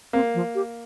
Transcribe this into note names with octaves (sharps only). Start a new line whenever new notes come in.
A#3 C4
F3
G4